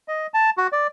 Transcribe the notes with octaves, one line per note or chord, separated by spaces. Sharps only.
D#5
A5
F#4
D5